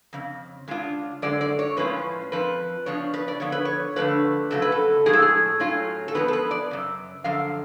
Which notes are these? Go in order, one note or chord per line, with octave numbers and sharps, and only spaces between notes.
F2 C#3
C#3 G#3 D4 F4
F#2 D3 G#3 D5
D5
C#5
A2 F3 G#3 C#4 F4 B4
F2 F3 B4
C#3 F3 B3 D4 C#5
B4
D5
D3 F3 B3 C#5
B4
C#5
D3 F3 A3 F4 B4
F2 C#3 F#3 A3 A4
B4
A4
A2 F3 G#3 G#4
A4
G#4
A2 F#3 C#4 F4
A4
F#2 F3 G#3 B3 B4
A4
B4
D5
F#2 C#3
F#2 D3 F3 F5